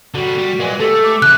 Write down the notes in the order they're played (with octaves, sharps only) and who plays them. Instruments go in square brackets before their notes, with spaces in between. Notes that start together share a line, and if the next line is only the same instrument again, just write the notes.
[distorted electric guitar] D3 G3 [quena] F#4
[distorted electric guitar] G3
[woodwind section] A#2 E3 [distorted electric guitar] G#3
[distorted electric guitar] A3 [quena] G4 [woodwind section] A4
[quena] D6
[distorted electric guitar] C#3 E3 [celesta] F#6